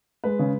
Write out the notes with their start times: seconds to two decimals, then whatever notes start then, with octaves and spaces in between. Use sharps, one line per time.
0.24 G#3 B4
0.39 C#3